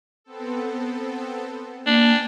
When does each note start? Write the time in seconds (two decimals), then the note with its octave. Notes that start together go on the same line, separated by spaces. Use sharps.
0.24 B3 C4 A4
1.86 A#3 D4 G5 G#5